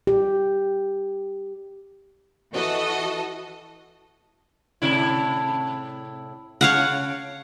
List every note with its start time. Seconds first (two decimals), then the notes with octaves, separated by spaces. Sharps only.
0.07 G4
2.52 E3 F#4 A4 D#5
4.82 A2 C3 E4
6.61 C#3 C#5 F5 F#5